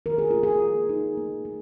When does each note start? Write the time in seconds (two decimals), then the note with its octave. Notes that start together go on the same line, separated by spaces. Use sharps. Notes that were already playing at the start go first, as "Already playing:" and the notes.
0.06 D#3 A#4
0.18 G#4
0.31 A#3 F4
0.43 G#4
0.62 A#3
0.89 D#4
1.17 A#3
1.45 A#3